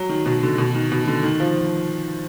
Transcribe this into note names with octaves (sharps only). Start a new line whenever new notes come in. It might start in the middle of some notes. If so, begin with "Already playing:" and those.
Already playing: F#3
D#3
B2
D3
B2
D#3
B2
D3
D#3
F3